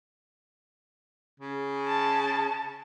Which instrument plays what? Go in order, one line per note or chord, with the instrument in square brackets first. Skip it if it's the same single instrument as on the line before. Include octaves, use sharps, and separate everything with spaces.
[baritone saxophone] C#3
[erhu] A5